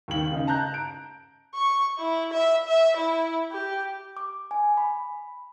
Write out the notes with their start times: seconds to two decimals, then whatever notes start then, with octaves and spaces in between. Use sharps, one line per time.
0.08 D#2 D#3 F#7
0.31 C#3 D#4
0.47 A5 A#5 F#6 G6
0.74 D7
1.55 C#6
1.99 E4
2.33 E5
2.67 E5
2.97 E4
3.52 G4
4.17 D6
4.51 G#5
4.77 B5